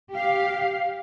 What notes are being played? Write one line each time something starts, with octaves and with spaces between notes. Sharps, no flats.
G4 F5